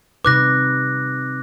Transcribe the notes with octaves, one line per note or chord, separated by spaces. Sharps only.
C3 D#4 B4 D6 F#6 A#6